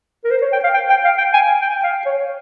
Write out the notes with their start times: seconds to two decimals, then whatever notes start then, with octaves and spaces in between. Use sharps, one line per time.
0.24 A#4
0.31 C5
0.41 C#5
0.52 G5
0.64 F5
0.74 G5
0.90 G5
1.04 F5
1.18 G5
1.33 G#5
1.61 G5
1.83 F5
2.06 C#5